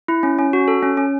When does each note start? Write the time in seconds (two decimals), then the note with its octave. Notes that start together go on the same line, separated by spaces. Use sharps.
0.08 E4
0.23 C#4
0.38 C#4
0.53 F#4
0.68 A4
0.83 C#4
0.97 C#4